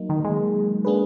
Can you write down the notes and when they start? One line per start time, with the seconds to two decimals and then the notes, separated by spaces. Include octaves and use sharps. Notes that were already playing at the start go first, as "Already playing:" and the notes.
Already playing: F#3 A#3 D#4
0.09 D#3
0.25 G#3
0.85 A#3 D4 G#4 B4